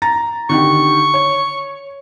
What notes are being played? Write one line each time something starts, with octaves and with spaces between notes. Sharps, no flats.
A#5 A6 A#6
D3 D#3 G4 C#6
C#5